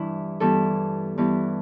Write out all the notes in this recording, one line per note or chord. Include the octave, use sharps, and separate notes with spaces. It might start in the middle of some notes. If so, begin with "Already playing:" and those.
Already playing: G2 E3 D4 E4
G2 E3 B3 A4
G2 E3 B3